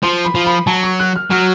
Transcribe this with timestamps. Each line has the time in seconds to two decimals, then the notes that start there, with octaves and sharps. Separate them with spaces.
0.03 F3 C6
0.25 B5
0.35 F3
0.46 B5
0.67 F#3 A5
0.83 C#6
1.00 F#6
1.16 F6
1.31 F#3 F6